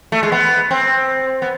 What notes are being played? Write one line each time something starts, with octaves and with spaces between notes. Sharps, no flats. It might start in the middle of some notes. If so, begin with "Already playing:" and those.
A3
G#3
B3
C4
B3